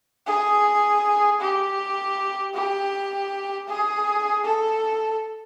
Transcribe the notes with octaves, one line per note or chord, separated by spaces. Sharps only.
G#4
G4
G4
G#4
A4